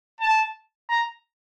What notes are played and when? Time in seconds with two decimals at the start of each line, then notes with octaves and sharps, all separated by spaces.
0.20 A5
0.89 A#5